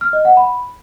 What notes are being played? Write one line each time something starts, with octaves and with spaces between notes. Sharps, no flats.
F6
D#5
F#5
B5